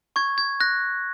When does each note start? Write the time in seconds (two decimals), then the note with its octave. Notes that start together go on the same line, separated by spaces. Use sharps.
0.16 C#6 G#6
0.38 G#6
0.60 F#6 A#6